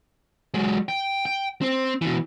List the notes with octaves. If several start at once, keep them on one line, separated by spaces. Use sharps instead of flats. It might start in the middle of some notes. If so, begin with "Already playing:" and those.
F#3 G#3
G5
G5
C4 C5
B2 E3